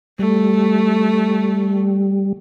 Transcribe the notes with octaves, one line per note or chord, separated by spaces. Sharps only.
G3 A3